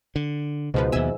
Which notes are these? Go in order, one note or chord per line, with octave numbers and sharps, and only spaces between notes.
D3
C#2 G#2 B2 F3 B4
D#2 B2 E5 G#5 E6